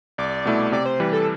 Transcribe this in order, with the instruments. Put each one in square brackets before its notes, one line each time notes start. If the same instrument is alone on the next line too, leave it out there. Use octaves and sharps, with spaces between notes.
[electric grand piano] C2 [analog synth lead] D5
[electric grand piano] B2 A3 E4
[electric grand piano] C3 [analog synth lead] D5
[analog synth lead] C5
[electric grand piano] E3 G3 [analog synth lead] B4
[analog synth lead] A4